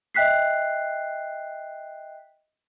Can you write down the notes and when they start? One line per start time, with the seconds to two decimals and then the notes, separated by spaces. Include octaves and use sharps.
0.14 D#5 E5 G5 F#6 B6 C7